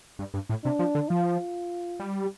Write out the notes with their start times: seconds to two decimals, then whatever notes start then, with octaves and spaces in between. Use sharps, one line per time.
0.19 G2
0.34 G2
0.49 A2
0.64 C3 D4
0.79 F3
0.95 D3
1.10 F3 F4
2.00 G3